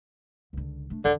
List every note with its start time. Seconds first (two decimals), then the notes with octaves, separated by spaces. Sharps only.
0.53 C#2 D3
0.90 A3 D4
1.05 F2 D3 E3